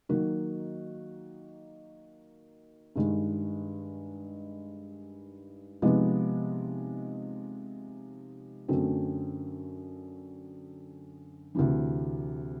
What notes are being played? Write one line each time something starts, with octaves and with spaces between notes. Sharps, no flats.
D#3 F#3 A#3 D#4 F#4
G2 D#3 G#3
C3 F3 G#3 B3 D#4
F#2 D3 F#3 A3 C4
D2 C3 E3